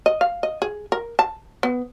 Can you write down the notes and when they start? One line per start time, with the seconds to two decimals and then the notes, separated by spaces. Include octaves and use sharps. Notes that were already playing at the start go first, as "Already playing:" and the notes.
0.06 D#5
0.21 F5
0.43 D#5
0.62 G#4
0.92 A#4
1.19 A5
1.63 B3